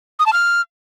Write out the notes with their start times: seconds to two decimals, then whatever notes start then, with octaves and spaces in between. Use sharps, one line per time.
0.19 D#6
0.26 A5
0.33 F6